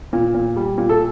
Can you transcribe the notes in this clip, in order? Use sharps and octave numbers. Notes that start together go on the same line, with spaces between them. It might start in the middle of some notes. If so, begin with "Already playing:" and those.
A#2
A#2
G3
A#2
A4